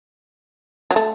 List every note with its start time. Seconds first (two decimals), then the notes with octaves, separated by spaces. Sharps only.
0.91 F#3
0.96 A3